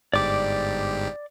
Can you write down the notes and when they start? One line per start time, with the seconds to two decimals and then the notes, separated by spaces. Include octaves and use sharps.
0.13 G1 G#2 G4 D5 D6